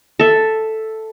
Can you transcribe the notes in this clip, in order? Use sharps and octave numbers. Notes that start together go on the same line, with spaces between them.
A4 E5